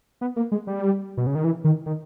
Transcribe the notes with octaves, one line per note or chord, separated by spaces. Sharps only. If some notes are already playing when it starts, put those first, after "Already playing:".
B3
A#3
G#3
G3
B2
C#3
D#3
E3
D#3
D#3